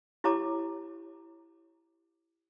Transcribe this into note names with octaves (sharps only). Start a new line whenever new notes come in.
E4 G4 C#5 A5 A#5 D6